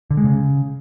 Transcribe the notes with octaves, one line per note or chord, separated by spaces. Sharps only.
D3
G#3
C#3